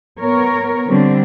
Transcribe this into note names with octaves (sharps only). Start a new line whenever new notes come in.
B3 A#4 C#5
D3 G3 C4 D4